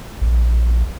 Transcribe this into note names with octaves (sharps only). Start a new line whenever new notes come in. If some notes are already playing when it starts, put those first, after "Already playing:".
A#1